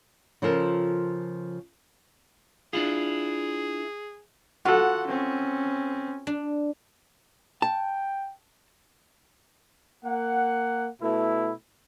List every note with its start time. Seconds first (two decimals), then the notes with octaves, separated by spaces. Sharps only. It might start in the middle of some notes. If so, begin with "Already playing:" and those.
0.42 C#3 F3 F4 A4 A#4
2.73 D4 E4 F4 G#4
4.65 F4 F#4 A4 F#5
5.08 C4 C#4
6.27 D4
7.62 G5 A5
10.04 A#3 F#5
11.01 B2 A3 E4